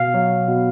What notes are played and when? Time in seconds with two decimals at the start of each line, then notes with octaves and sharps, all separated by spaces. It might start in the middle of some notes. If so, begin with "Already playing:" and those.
Already playing: B2 F5
0.14 F#3
0.48 B2